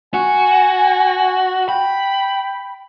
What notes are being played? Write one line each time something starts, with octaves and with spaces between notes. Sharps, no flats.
F#4 G#5
G5 B5